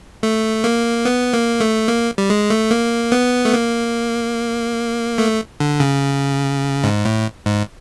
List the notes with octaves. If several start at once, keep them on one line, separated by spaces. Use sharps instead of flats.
A3
A#3
B3
A#3
A3
A#3
G3
G#3
A3
A#3
B3
A3
A#3
A3
D3
C#3
G#2
A2
G#2